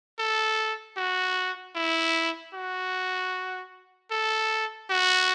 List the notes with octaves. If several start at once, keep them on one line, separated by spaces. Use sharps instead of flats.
A4
F#4
E4
F#4
A4
F#4